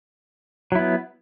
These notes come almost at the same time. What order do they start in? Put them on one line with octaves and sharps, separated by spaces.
F#3 E4 B3